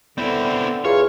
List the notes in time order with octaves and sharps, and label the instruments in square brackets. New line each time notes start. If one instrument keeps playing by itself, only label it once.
[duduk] D3 [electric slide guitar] B3 D5 [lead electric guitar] C4 E4
[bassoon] E2 [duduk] F4 [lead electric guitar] C#5 [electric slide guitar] F5